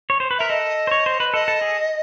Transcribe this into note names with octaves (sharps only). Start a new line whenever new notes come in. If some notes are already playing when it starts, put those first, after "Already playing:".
C#5
C5
B4
A#4 E5
A4 D#5
C5
C#5
C5
B4
A4 D#5
A4
G#4